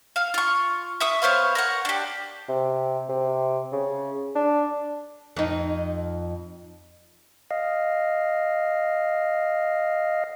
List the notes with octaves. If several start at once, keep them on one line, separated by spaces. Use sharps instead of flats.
F5
F4 C#6
E5 C#6 D#6
B3 C5 C#5 F5
A#4 C#5 F#5
D4 G4
C3
C3
C#3
D4
F2 D#4
D#5 F5